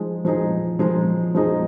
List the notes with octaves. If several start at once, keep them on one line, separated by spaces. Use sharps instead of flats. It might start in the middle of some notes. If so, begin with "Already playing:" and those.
Already playing: F3 G#3 D#4 G#4
F3 G#3 D#4 G#4
F3 G#3 D#4 G#4
F3 G#3 D#4 G#4